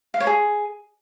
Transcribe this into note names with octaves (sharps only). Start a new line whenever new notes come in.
F5
C#5
G#4